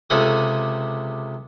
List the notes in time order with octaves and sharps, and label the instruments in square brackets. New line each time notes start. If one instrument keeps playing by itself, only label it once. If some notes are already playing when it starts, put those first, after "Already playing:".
[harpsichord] C#2 C3 G#4 A4 D#6